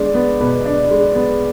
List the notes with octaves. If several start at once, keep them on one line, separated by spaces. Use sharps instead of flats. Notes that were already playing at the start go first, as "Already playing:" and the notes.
Already playing: G#3 B3 D4
B3
B2 B4
D4
G#3
B3